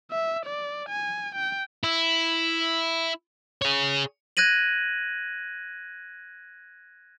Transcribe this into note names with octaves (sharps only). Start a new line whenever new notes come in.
E5
D5
G#5
G5
E4
G#4 C#5
F#6 G#6 A#6 D#7 F#7